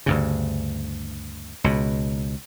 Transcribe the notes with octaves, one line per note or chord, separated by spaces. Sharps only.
D2 G2 C#3
C#2 B2